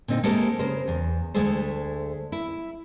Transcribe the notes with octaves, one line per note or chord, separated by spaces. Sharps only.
A#2 D3 C4 D#4
G#3 A#3 G4 A4 A#4 C5
C#3 A#4 C5
E2
D2 G#3 A3 G#4 A4 C5
E4 E5